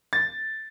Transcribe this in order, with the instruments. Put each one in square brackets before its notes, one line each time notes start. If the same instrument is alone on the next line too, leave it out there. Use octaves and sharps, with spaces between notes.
[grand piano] A6